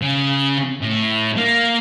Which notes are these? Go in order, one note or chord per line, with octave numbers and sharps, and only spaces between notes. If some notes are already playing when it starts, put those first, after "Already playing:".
C#3
A2
A#3